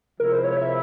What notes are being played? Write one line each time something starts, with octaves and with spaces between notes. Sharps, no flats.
C3 F3 G#3 E4 A#4
C5
C#5
E5